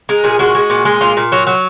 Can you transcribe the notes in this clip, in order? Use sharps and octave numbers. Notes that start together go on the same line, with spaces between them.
G#3 A#4
A#2 G#4
G#3 F#4
G#3
A#2
G#3
A#2 F4
A#2
F#3
F#3